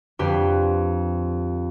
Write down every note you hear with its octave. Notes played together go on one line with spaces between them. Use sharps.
F2 D3 G4 B4 C6